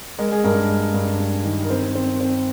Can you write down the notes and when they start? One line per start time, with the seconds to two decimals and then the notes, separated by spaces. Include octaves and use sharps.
0.19 G#3 A#4
0.32 G#4
0.44 G2 A#4
0.69 G#3
0.94 G2
1.20 G2
1.45 D#3
1.64 A#4
1.70 C4 C5
1.95 C4
2.21 C4